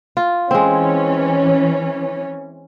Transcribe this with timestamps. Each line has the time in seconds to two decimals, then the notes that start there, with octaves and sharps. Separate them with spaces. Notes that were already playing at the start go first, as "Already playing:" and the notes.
0.17 F4
0.51 E3 G#3 C4 C#4